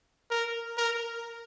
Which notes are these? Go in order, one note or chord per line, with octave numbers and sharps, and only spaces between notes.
A#4
A#4